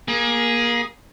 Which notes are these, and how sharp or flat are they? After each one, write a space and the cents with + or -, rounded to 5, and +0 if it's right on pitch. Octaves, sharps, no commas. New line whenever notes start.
A#3 +25 G#4 +0